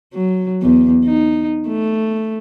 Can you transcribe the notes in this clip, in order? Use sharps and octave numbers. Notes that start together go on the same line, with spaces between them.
F#3
E2
D#4
A3